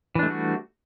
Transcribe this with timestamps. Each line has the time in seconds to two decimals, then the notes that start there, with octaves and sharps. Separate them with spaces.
0.15 E3
0.19 D4
0.23 A3
0.26 G3
0.30 F#4